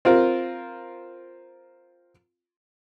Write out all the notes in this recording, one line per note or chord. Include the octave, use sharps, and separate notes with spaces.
C4 F4 A#4